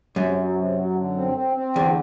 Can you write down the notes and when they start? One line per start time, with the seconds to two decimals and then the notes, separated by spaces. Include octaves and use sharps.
0.16 F#2 C3
0.37 F#3
0.56 C3
0.76 F#3
0.96 D3
1.16 C4
1.36 C4
1.55 C4
1.75 E2 D3